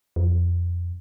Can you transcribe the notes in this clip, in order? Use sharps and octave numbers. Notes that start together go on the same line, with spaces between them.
F2